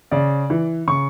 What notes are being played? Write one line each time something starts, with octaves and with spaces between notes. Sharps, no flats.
C#3 D5
E3
C#3 C#6